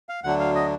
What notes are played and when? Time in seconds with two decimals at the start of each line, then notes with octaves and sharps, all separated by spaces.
0.09 F5
0.24 D2 D3 F#3 D4 F#5
0.40 F5
0.55 D#5